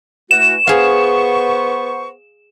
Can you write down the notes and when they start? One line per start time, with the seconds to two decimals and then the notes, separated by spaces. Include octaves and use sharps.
0.31 E3 A3 F#4 E7
0.67 B3 G#4 C5 F5 C#6